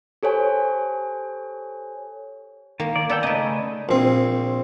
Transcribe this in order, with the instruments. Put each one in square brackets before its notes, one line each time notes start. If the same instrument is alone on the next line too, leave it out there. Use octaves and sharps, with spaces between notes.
[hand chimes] G4 A4 C5 C#5 G#5
[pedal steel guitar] D#3 [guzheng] A#3
[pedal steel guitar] D#3 D5
[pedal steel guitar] B3 A4 G5 [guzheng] D5
[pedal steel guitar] C#3 A3 G#5 [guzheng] D#4 B4
[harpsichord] A#1 C4